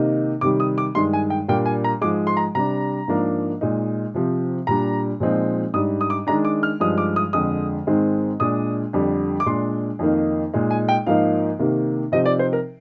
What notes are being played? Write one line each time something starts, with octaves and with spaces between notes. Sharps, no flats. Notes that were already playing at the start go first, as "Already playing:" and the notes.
Already playing: C3 D#3 A#3 D#4
C3 D#3 G3 D6
D#6
D6
G2 D#3 G#3 C6
G#5
G5
A#2 G3 A#3 D4 G5
G#5
A#5
G#2 F3 G#3 D6
C6
A#5
C3 G3 D4 A#5
G#2 F3 A#3 D4
A#2 G#3 D#4
C3 F3 C4
A#2 G3 D4 A#5
A#2 F3 G#3 C4 D#4
G#2 G3 D4 D#6
D#6
D6
D#3 G#3 D4 A#5
D6
F6
G2 F3 G#3 D#4 D#6
D6
D#6
F2 D3 G#3 D#6
G#2 D#3 G#3 C4
A#2 G#3 D4 D#6
F2 D3 G3 D4
D6
A#2 G#3 D4 C6
F2 D#3 A#3 D#4
A#2 G#3 D#4
G#5
G5
G#2 F3 A#3 D#4 F5
C3 D#3 A#3
C3 F3 C4 D#4 D#5
D5
C5
A#4